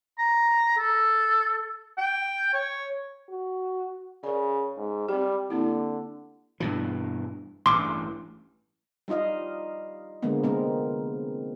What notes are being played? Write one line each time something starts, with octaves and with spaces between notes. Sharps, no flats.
A#5
A4
G5
C#5
F#4
C#3 A#4 D5
G#2
G3 C4 G4
D3 A#3 C4 E4
G2 B2 E3
A1 G2 C6 D6
G3 D#4 F4 D#5 F5
D3 F3 G#3 A#3 B3
C3 G#3 C4 A#4